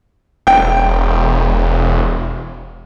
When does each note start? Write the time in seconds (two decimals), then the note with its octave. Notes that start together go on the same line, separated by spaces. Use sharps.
0.47 E1 G5